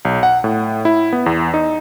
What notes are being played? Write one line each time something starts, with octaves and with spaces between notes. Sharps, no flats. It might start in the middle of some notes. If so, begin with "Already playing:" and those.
B1
F#5
A2
E4
B3
E2
D#4